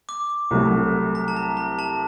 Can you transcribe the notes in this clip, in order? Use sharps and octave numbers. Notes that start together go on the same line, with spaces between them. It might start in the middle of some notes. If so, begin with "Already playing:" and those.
D6
C2 C3 F#3 A3
A#5
A5
A#5
A#5
A5